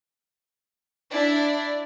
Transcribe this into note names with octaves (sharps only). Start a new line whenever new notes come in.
D4 E4 D5